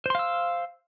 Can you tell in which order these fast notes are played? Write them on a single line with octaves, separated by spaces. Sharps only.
C5 C6 F5 E6